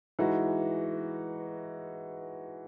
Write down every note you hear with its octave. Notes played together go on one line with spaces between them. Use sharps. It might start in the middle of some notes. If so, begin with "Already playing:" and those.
E3 G#3 D#4 F#4